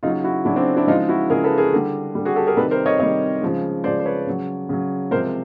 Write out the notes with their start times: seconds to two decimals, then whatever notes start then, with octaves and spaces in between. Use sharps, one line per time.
0.03 C#3 D#4 F4
0.06 F#3
0.24 E4 F#4
0.45 C#3 F#3 D4 E4
0.56 C4 D4
0.76 D4 E4
0.87 C#3 F3 G#3 D#4 F4
1.08 E4 F#4
1.30 C#3 F3 G#3 G#4 A#4
1.44 A4 B4
1.58 G#4 A#4
1.73 D3 G3
2.15 D3 G3
2.25 F#4 G#4
2.36 G4 A4
2.47 G#4 A#4
2.57 C3 D#3 G3 A4 B4
2.71 A#4 C5
2.86 C#5 D#5
2.99 C3 D#3 G3 C#5 D#5
3.42 C#3 F3 G#3
3.84 C#3 F3 G#3 C5 D5
3.99 C5
4.05 B4 C#5
4.27 C#3 F#3
4.69 C#3 F#3
5.11 C3 F3 G#3 A#4 C5